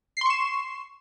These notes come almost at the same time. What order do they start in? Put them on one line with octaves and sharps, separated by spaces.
C7 C6 C#6 E7